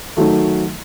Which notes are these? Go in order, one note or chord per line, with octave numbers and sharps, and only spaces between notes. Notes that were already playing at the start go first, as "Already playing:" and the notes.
D#3 F#3 A3